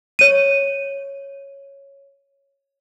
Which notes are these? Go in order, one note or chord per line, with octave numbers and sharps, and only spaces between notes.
C#5 D#7